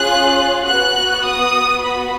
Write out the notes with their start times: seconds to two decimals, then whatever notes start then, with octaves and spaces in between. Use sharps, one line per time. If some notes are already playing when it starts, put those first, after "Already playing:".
Already playing: C#4 F4 G#4 F#6
0.66 B3 F#4 F#6
1.24 D#6
1.82 B3 F#4 B5